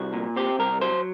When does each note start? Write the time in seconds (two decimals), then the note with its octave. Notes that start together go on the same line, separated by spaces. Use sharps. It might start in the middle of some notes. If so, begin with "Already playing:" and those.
Already playing: C2 F#4
0.13 A#2
0.36 C4 G4
0.59 C2 A#4
0.81 F#3 C5